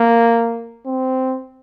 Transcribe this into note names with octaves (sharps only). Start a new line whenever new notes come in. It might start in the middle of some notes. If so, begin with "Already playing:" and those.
Already playing: A#3
C4